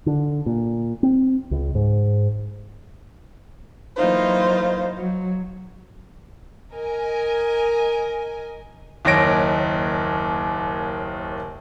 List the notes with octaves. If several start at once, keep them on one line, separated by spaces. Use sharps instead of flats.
D3
A#2
C4
C#2
G#2
E3 F#3 A#3 D#4 F4 C5
F#3
A#4 D#5 G#5
F#1 D#2 D#4 C#5 A#6 D7